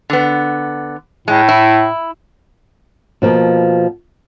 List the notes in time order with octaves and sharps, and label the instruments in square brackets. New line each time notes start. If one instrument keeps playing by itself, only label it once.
[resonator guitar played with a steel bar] D3 B3
[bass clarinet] A2 [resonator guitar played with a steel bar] G#3
[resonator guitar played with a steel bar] E4
[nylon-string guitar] B2 F3 A#3